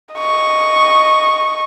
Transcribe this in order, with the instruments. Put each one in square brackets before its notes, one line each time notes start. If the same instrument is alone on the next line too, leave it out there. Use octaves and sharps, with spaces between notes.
[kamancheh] D#5 C#6